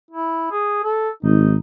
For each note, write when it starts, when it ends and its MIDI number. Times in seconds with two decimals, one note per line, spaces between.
0.11 0.51 64
0.52 0.80 68
0.84 1.09 69
1.23 1.56 32
1.23 1.55 63